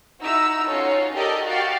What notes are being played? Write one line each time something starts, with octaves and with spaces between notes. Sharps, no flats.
D#4 E4 F#4 A#5 E6
C#4 D#4 F4 F#4 A4 C#5
G4 A4 A#4 D5 D#5 G5
F#4 G4 F5 G5 A6